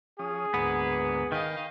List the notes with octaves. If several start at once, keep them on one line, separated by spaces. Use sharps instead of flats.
F3 C#4 G#4 D#6
D2 G#2 A#3 B3 B4
D#3 D#5 F5 G5 B5